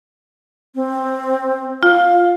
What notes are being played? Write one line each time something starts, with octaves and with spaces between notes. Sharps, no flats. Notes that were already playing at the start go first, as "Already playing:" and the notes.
C4
F4 F5